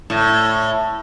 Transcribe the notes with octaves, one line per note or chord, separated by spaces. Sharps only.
A2